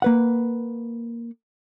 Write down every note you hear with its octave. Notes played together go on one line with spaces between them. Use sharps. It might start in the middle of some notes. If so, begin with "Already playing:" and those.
A#3 B4 F#5